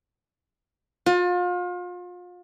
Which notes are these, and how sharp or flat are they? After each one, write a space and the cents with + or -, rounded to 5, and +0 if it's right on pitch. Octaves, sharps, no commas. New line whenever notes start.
F4 +35